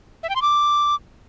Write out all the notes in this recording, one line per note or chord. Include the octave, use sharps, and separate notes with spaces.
E5
G5
C6
D6